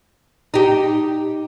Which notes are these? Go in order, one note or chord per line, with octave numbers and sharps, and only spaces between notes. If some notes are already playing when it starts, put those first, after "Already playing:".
D#4 G4